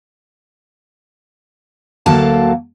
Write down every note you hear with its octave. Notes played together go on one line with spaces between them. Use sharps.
D2 F#3 A#3 A4 F5 A5